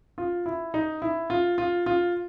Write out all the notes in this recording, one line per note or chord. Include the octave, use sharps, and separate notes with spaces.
F4
E4
D#4
E4
F4
F4
F4